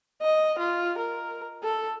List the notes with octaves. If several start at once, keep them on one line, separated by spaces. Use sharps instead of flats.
D#5
F4
A#4
A4